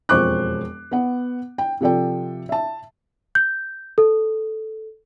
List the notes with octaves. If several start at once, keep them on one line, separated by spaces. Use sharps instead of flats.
E1 F2 C5 C#6 D6 F#6
B3 F#5
G5
C3 F3 A4 D5 G5
E5 A5
G6
A4